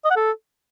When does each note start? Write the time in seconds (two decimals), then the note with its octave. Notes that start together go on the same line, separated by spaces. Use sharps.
0.04 D#5
0.10 F#5
0.16 A4